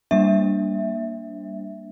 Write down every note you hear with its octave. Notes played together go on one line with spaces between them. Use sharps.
G3 A#3 D4 E5